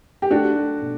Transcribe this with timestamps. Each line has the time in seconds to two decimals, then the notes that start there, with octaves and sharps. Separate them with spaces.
0.22 G4
0.30 A3 D4 F#4
0.56 A3
0.81 B2